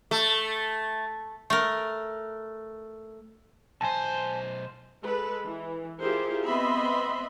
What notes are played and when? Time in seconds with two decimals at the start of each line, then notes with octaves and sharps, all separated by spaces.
0.11 A3
1.50 A3 A#4
3.81 B1 C5 G#5 A5
5.04 G#3 A4 B4
5.46 E3
6.01 E4 F4 G4 G#4 A#4 C5
6.47 B3 C4 D#5 E5 B5 C6